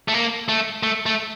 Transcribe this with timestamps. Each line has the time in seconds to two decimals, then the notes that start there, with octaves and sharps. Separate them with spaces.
0.08 A3
0.14 A#3
0.49 A3
0.83 A3
1.06 A3